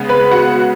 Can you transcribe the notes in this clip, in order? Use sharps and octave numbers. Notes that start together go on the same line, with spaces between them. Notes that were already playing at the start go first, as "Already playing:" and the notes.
Already playing: C#3 G#3 B3
B4 B5
F#4 F#5